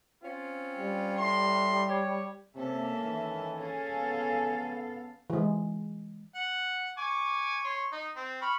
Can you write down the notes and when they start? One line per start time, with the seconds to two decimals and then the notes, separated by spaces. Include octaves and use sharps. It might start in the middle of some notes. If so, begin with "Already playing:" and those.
0.22 C4 C#4 F4
0.78 G3
1.18 A2 C6
1.88 G4 C#5
2.55 C3 A#3 C#4 A4 E5
3.02 D#3 E3
3.57 C#4 G#4 A4 F5
3.95 B3
5.30 E3 G#3
6.35 F#5
6.97 G#5 C#6 D6
7.64 C#5 C6
7.92 D#4
8.17 C4
8.41 B5 C#6 F6